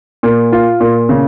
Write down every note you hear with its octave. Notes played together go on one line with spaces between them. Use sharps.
A#2
F4
A#2
C#3